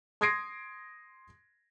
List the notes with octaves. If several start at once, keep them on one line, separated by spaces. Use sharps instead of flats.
C6 D#6 G#6 A#6 C7 D7